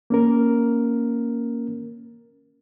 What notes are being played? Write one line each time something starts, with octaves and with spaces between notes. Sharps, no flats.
A#3 C#4 A#4